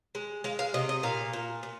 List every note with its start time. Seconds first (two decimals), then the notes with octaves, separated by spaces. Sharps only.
0.15 G#3
0.44 G#3 F5
0.59 F5
0.74 C3 D#5
0.89 D#5
1.03 A#2 F5
1.33 A#2
1.63 A#2